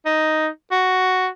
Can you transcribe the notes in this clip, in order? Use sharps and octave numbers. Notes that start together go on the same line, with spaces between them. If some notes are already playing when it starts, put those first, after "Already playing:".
D#4
F#4